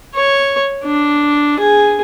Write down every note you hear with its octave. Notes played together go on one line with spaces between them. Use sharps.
C#5
D4
G#4